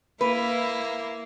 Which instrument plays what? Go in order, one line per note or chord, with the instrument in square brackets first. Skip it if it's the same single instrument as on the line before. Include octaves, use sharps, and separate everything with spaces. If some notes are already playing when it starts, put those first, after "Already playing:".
[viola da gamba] A#3 E4 [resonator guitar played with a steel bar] B4